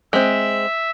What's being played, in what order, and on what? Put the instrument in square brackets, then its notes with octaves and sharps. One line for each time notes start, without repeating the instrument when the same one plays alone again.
[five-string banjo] G#3 C4 [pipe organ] E5